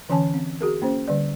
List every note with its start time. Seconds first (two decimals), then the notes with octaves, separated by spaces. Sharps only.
0.09 D3 E3 C#4 C#5 G#5 A5
0.34 C4
0.61 F#4 G#4 A#4
0.82 A#3 C#4 C5
1.08 D3 G3 D5